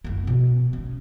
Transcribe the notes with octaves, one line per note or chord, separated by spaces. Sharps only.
F#1 E4
B2
C#4